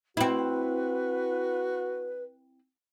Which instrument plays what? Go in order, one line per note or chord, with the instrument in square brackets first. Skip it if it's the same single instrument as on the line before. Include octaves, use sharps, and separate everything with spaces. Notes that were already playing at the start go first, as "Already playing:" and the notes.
[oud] C4 E4 [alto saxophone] F#4 [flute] B4